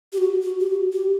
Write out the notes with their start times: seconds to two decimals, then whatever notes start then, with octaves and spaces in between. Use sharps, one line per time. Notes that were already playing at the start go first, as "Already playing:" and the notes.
0.13 G4
0.18 F#4
0.42 F#4
0.60 G4
0.67 F#4
0.93 G4